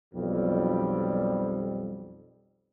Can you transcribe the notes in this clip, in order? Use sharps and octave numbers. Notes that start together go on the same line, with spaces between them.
B1 F2 G3